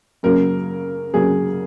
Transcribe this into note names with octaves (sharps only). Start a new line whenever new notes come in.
F#2 C#3 F#3 A#3 C#4 A#4
F#2 C#3 F#3 A#3 C#4 G#4